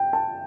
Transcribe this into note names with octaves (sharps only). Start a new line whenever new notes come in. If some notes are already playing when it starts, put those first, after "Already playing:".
Already playing: G5
A5